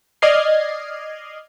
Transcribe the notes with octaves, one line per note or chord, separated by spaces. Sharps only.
D5 D#5 F6 G#6 C7